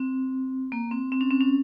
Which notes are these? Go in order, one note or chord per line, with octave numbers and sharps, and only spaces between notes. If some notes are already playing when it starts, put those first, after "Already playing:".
Already playing: C4
A#3
C4
C4
C#4
C4
C#4